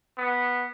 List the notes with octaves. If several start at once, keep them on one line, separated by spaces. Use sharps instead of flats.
B3